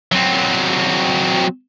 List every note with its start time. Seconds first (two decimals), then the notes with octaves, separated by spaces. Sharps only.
0.12 F#3 C4